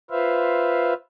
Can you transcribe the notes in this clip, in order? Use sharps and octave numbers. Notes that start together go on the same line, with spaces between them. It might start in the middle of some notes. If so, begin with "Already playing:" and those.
F4 B4 C5 E5 F5